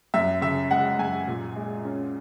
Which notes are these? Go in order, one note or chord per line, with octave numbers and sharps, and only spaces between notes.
F#2 E5
C#3 E5
G#3 F#5
F#2 G#5
A#2
G#3
C#4